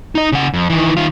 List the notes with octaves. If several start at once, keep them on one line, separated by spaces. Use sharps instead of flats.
D#4 D#5
C#3 F#5
F2
D#3 E3
D#3 F4